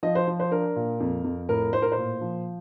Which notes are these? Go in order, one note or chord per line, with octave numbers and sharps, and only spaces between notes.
F3 D#5
C5
F3
C5
D4 A#4
A#2
F2
F2
A2 A#4
A2 C5
A#4
C5
A#2
F3